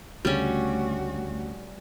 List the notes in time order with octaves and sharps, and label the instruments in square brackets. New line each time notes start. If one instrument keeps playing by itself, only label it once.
[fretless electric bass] D2 C#3 [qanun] G3 C#4 [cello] A3 F#4